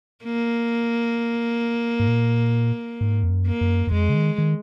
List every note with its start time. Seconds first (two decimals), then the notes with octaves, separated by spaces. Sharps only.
0.24 A#3
2.00 G#2
2.08 A#2
3.01 G#2
3.23 F2
3.30 F#2
3.46 A#3
3.61 F#2
3.87 F#2
3.92 F2 G#3
4.09 C#3
4.15 D#3
4.38 D#3